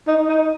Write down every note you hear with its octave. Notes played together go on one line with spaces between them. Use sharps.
D#4
D#4